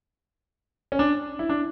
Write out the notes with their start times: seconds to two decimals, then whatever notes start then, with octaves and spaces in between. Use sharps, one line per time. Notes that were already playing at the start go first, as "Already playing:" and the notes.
0.92 C#4
0.99 D4
1.39 E4
1.49 D4